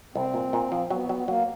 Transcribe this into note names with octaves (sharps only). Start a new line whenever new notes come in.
C2 C4
A#2
A#2
F3
F#3 B3
F#3
F#3 A#3